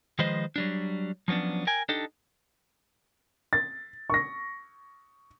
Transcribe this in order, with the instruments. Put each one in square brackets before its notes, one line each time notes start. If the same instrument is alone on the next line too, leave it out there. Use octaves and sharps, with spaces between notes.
[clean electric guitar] D#3 F3 G#3 B4 C5 D#5
F#3 G3 D4
F3 F#3 B3 C#4 D4
A#4 G5 G#5
D4 D#4 G4 A4
[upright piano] A6
C#6 A#6